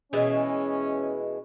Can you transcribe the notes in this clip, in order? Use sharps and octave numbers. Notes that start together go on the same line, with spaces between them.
B2 E3 G#3 C#4